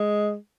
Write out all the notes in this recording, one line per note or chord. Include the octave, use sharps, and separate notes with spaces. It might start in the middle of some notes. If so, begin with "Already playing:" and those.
Already playing: G#3